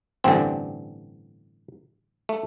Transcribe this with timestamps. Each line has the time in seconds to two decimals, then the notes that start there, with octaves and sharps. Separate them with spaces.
0.24 A1 G2 D3 C4
2.29 A3